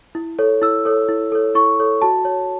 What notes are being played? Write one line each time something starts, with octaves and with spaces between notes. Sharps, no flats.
E4
A4 C#5
E4 E6
A4 C#5
E4
A4 C#5
E4 C#6
A4 C#5
F#4 A5
C#5